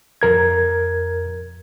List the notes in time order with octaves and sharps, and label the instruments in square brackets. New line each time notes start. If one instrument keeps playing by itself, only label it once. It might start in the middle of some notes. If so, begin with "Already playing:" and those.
[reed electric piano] F2 A#4 G#6